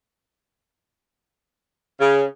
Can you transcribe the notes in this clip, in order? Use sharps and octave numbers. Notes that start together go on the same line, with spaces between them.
C#3